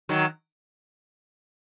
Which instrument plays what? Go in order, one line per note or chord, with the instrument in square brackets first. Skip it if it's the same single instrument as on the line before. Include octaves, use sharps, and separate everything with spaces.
[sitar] D#3 F#3